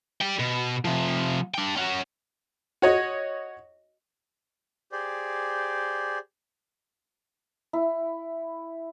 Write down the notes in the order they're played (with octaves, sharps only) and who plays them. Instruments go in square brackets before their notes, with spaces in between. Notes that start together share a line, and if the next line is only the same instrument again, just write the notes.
[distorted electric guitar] D5 G5
B2
C3 F3
D4 G5
C#4 F#4
[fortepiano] F#4 C#5 D#5
[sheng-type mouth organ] G4 G#4 C5 D5
[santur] E4